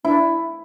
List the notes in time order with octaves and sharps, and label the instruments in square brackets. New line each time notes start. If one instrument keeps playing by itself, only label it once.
[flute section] D4 [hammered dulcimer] E4